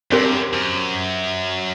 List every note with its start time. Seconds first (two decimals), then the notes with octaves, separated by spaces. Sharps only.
0.11 G2 C4 G4 A#4
0.25 F#2
0.53 F#2